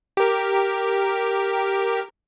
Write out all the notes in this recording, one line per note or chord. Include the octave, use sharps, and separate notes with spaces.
G4 A#4